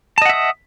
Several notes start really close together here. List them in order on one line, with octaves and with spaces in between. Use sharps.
A5 D#5 F#5 E5 D#6